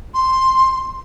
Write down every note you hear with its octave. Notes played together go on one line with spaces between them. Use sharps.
C6